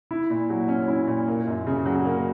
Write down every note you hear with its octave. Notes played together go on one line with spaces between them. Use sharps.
E4
A#2
F#3
C#4
E4
A#2
A#3
F#2
C#3
F#3
A#3